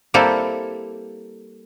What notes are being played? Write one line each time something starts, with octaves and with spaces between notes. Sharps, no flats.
G3 A#3 C4 E4 G4 A4